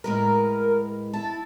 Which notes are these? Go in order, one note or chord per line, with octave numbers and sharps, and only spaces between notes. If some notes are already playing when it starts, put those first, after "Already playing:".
A2 G#3 A#4 B4
E4 A5